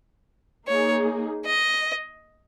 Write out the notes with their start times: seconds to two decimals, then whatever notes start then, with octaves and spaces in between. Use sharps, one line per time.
0.68 A#3 D#4 G#4 C#5
1.46 D#5